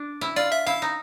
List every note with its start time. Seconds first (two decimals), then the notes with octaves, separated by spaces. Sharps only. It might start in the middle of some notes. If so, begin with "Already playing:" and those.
Already playing: D4
0.21 E4
0.36 F4 D5
0.52 E5
0.67 E4 F5
0.82 D#4